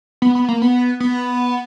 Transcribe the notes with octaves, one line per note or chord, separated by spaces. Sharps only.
B3
B3
A#3
B3
B3